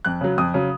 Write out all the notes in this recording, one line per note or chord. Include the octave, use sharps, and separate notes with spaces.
F2 F#6
C#3 F#3
F2 D#6
C#3 F#3